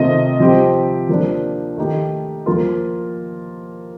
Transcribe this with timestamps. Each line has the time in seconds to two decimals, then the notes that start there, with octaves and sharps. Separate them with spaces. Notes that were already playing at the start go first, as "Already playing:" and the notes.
Already playing: C3 D#3 A3 C4 F4 D#5
0.40 F3 C4 G4
1.09 F3 A#3 D4
1.77 D#3 A3 D#4 G4
2.46 F3 A#3 F4